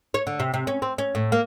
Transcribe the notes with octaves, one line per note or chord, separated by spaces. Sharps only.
C#5
D3
C3
C3
C#4
C4
C#4
A2
A#3